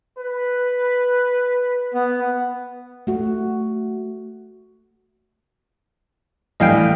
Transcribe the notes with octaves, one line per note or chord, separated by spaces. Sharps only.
B4
B3
A3 F#4
A2 E3 G3 D#5 F5 G5